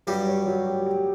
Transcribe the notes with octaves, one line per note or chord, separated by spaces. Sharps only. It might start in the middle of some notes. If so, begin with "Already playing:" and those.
G2 F#3 G3
C#5
F#3
G4
G4